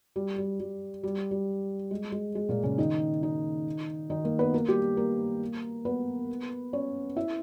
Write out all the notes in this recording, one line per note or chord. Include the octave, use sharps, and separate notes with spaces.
G3
G3
G3
G3
G3
G#3
G#3
G#3
A#2 A#3
C#3 C#4
D#3 D#4
D#3 D#4
D#3 D#4
A#3 A#4
B3 B4
A#3 A#4
G3 G4
A#3 A#4
B3 B4
C#4 C#5
E4 E5